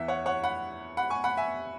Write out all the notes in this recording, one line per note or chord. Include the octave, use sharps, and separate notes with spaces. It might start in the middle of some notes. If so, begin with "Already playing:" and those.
Already playing: E2 E3 E5
C#5 F#5
C#5 F#5
F#5 B5
F#5 B5
G#5 C#6
F#5 B5
E5 G#5